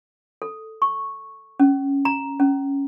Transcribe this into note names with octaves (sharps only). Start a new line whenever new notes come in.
A4
C#6
C#4
A#5
C#4